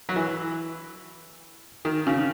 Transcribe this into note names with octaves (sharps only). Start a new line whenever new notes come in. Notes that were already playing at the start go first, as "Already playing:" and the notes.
F#3
E3
D#3
C#3